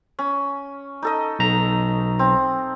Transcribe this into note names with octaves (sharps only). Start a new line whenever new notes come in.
C#4
D#4 A4 D#5
B1 A#5
C4